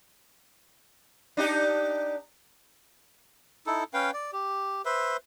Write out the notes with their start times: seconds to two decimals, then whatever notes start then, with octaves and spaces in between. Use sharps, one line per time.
1.37 D4 D#4 G4
3.66 D#4 E4 A4
3.94 C#4 B4 F5 G5
4.14 D5
4.33 G4
4.85 B4 C5 E5